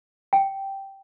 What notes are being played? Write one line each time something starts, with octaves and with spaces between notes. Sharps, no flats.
G5